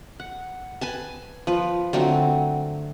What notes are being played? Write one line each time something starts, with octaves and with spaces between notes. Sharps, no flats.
F#5
B4 G#5 A5
F3 B4
D3 F#3 A3 C4